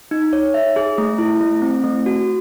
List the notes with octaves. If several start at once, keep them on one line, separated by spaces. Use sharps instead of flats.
D#4
C#5
E5
G#4
A3
E4
A3
C4
A3
F#4